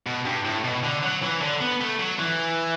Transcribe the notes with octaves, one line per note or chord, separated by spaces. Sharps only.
B2
G2
A2
B2
D3
F#3
E3
D3
B3
A3
F#3
E3